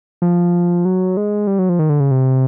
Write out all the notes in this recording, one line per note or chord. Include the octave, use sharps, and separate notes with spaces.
F3
F#3
G#3
G3
F#3
F3
D#3
D3
C#3
C3